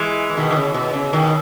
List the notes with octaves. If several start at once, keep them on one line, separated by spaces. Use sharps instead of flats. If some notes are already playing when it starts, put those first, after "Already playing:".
Already playing: E3 G#3
E3
B2 D#3
D#3
C#3
B2
C#3
B2 D#3